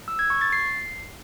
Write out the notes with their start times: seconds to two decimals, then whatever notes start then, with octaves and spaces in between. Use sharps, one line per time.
0.08 E6
0.19 G#6
0.30 C#6
0.41 A6
0.53 C7